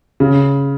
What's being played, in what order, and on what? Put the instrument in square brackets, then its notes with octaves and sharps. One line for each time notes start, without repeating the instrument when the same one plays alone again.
[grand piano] C#3